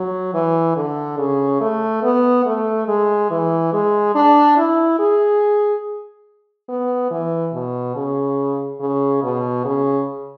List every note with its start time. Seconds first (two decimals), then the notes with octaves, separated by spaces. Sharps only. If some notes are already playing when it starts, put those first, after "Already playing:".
Already playing: F#3
0.34 E3
0.76 D3
1.18 C#3
1.61 A3
2.03 B3
2.46 A3
2.88 G#3
3.31 E3
3.73 G#3
4.15 D4
4.57 E4
4.99 G#4
6.69 B3
7.11 E3
7.54 B2
7.96 C#3
8.80 C#3
9.23 B2
9.65 C#3